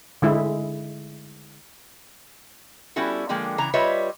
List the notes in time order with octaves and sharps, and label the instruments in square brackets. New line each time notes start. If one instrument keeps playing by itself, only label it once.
[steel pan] D3 G#3 E4
[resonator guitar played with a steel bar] G3 B3 C#4 E4 F#4 A4
D3 F3 G#3 A#3 G5
C#3 E3 A#5
G3 F4 B4 C#5 D#5 E5